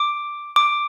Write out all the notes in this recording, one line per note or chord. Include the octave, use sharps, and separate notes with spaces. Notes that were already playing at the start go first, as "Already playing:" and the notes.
Already playing: D6
D6